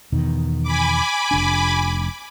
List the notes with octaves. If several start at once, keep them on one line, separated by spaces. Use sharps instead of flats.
E2 B2 D#3
G#5 B5 D6
F1 D4